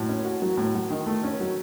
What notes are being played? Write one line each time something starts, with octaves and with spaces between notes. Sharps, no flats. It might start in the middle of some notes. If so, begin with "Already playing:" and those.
Already playing: A2 F#3
C#4
F#4
F#3
A2
F#3
D#3
A3
C#4
F#3